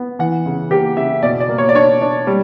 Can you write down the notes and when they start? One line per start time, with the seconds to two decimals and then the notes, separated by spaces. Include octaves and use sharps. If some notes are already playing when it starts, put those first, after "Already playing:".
Already playing: B3
0.19 E3 F#5
0.46 C#3
0.71 A#3 G4
0.97 C#3 E5
1.23 B2 D5
1.40 D5
1.49 A#3
1.58 C#5
1.69 D5
1.75 D4 C#5
2.01 D4
2.27 G3